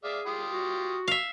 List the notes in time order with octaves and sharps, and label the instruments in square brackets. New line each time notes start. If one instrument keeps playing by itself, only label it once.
[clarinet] G#4 [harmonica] D5 E5 F5
[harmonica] F4 G4 D#6
[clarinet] F#4
[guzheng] E5 F5